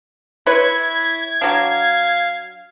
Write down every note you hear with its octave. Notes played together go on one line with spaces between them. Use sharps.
E4 B4 C#5 G#6
F#3 D4 F5